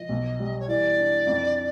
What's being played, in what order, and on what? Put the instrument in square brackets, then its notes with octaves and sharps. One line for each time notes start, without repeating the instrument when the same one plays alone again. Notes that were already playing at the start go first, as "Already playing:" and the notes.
Already playing: [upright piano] F3 [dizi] D#5
[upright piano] B1
G3
[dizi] C#5
[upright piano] E3 [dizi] D5
[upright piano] D4
F2